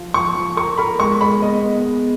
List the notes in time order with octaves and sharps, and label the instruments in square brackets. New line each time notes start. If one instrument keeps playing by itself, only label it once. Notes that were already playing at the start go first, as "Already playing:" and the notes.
Already playing: [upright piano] F3 F4
[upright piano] F3 [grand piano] C#6
[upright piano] F3
[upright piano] A#4 [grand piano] C#6
[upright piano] A#4 [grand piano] B5
[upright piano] G#3 [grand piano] C#6
[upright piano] G#3 [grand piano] B5
[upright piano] B3 [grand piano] D#5
[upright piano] B3